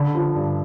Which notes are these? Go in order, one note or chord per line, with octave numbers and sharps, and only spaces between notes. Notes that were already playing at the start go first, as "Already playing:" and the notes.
Already playing: D3 B5
F3
G2